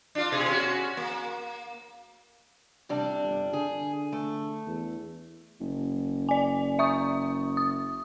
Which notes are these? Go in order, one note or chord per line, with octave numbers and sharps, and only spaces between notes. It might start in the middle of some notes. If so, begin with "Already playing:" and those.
D4 F4
B2 G#4
C#4 F#4
A#3
A1 C3 G3 D4
G1
D3 G#4
A3
E2
F#1
D5 G#5
E5 C#6 D#6
D#6